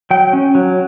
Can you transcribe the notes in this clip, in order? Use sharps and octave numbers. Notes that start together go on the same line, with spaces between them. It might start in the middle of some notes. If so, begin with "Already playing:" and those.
F#3 G5
C#4
F#3